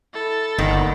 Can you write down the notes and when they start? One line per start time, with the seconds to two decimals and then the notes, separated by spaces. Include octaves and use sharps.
0.14 E4 A4
0.58 G1 D#3 A#3 B3 D5